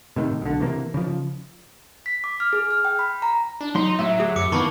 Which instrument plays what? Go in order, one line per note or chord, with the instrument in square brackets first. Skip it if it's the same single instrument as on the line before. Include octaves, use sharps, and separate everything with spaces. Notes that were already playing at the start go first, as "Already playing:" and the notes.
[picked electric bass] A2 C3 D#3
B1 D3
C3 E3 A#3
C#3 F3
[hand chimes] B6
D6
F6
G#4
F6
G5
B5
A#5
[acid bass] D4
[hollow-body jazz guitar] F#3 C6 [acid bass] D#4
[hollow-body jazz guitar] A2 [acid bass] F#3 [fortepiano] E5
[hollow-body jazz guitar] D2 G4 G#4
[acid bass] F#2 [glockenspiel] D6 C#7
[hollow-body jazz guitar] D#3 E3 B3 [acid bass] A#3 [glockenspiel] A5 B5 C#6